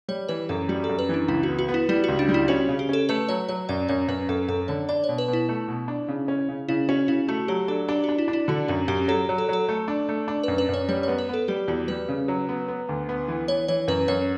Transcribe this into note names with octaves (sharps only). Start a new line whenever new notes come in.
G3 C#5
E3 B4
F#2 A4
G3 F#4
A4
F#2
B4
E3 D4
C#2 E4
B3 F#4
F#4
B3
E4
G3 E4
C#2 F#4
D4
G3
E4
C#4 F#4
C#3
G4
C#4 A4
A3 B4
F#3 C#5
F#3 C#5
F#2 D5
F#2 C#5
F#2 B4
F#2 A4
F#2 A4
D3 C#5
D4 D5
C#5
B2
B4
B2
E4
A3
B2
D4
C#3
C#4
C#3
C#3 E4
C#4 F#4
C#3 E4
A3 F#4
F#3 G4
D4 A4
D4 G4
D4 F#4
E4
D4
E4
D3 F#4
F#2 F#4
F#2 G4
F#3 A4
F#3
A4
F#3 A4
A3
D4
A3
D4
F#2 B4
B4
F#2 C#5
G3 C#5
B3 C#5
B4
B3 A4
G3 G4
E2 F#4
G3 B4
C#3
F#3
B3
B3
D2
B3
E3
E3 C#5
E3 C#5
F#2 B4
F#2 C#5